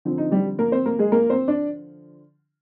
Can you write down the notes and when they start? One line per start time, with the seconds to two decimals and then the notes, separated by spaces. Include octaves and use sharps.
0.05 D3 F3 C4
0.18 D#4
0.31 G3 G4
0.59 A#3 A#4
0.72 C4 C5
0.86 A#3 A#4
0.99 G#3 G#4
1.12 A#3 A#4
1.30 C4 C5
1.48 D4 D5